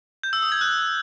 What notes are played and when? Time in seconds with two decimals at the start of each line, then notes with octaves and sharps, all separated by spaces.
0.23 G6
0.33 E6
0.42 D#6
0.52 G#6
0.61 F#6